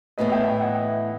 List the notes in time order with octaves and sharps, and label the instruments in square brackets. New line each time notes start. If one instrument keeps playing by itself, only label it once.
[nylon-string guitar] A2 E3 B3 [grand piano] B4 D#5
[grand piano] E5 G5
E5 G5
D#5 F#5